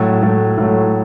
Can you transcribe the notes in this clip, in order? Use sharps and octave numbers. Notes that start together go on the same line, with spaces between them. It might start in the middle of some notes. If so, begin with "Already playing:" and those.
Already playing: A2 F#3 A3
A2 F#3 A3
A2 F#3 A3